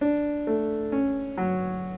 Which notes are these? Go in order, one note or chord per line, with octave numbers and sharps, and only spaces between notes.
D4
A3
C#4
F#3